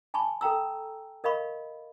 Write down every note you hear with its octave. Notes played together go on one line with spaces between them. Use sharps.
G#5 A5 B5 C#6
A4 G5 A#5 E6
A#4 D#5 F5 B5 C#6